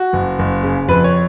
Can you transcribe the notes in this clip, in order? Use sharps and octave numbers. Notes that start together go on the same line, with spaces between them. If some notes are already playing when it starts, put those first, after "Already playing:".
Already playing: F#4
F#1
F#1
C#3
F2 B4
C#5